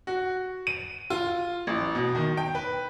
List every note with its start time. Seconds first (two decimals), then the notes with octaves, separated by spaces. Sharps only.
0.07 F#4
0.67 D#7
1.10 F4
1.67 A1
1.95 B2
2.15 D#3
2.37 G5
2.55 B4